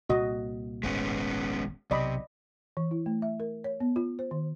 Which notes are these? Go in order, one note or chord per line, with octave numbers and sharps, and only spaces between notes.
C2 A#2 A#3 F#4 D#5
D#1 G#1 G#3 B3 C#4
B1 C3 D5 D#5 B5
E3
E4
A3
E5
A#4
C#5
B3
F4
C5
D#3